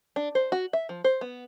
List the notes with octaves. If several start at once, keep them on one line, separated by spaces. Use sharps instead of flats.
D4
C5
F#4
E5
F3
C5
B3